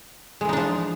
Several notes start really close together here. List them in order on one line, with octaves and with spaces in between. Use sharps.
G#3 E3 D#4 D4 F3